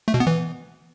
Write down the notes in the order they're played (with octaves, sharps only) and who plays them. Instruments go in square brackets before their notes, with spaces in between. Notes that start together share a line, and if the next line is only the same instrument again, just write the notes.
[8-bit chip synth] A3
B2
B3
E3